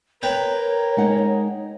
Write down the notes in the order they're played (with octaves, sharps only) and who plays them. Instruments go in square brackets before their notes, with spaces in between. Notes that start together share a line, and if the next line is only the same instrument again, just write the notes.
[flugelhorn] A#4 [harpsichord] B4 G5 [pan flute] C#5
[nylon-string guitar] G#3 D#4 F#5